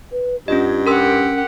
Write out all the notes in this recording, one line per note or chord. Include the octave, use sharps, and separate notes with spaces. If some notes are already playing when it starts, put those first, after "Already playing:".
B4
G2 C#4 F4 D#5
C#4 G4 A#4 F#5 C6 E6